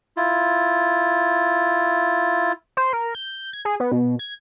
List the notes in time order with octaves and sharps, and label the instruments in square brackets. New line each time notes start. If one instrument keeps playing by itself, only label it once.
[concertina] E4 F4
[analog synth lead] C5
A#4
G6
G#6
G#4
B3
B2
G#6